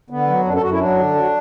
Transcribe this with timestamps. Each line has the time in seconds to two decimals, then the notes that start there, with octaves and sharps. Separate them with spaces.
0.10 D3 B3
0.28 F#3
0.45 F#2 D4
0.54 A4
0.62 F#2 F#4
0.72 E4
0.79 F#3 D4
0.97 D3
1.15 F#3